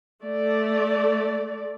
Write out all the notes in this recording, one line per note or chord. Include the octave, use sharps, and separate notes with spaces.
A3 D5